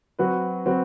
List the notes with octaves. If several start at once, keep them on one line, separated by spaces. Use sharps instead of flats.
F#3 C4 F#4 B4
F#3 C4 F#4 B4